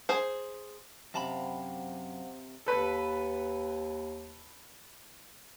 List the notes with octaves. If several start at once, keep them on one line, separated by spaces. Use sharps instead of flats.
G#4 C5
F#2 C3 C5 F5 F#5 A5 B5
D#2 A4 B4